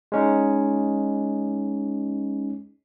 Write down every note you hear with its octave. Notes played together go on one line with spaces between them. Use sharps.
G#3 C#4 D#4